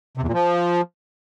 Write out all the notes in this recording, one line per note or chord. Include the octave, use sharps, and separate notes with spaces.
C3
E2
A#2
F3